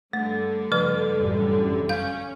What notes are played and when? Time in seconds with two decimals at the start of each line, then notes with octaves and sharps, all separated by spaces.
0.13 G2 D3 A3
0.72 C#3 F3 B4
1.17 A1 F#2 G3
1.89 C#4 F5 G6